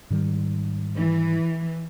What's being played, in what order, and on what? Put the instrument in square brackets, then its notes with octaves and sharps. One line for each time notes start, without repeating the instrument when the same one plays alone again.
[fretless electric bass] G#2 D#3 G3
[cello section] E3